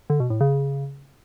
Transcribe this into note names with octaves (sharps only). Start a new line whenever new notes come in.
D3
B2
A2
C#3